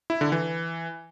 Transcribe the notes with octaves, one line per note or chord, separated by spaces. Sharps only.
E4
D3
E3